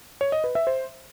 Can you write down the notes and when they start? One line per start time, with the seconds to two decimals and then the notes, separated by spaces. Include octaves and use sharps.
0.21 C#5
0.32 D#5
0.44 B4
0.55 E5
0.67 C5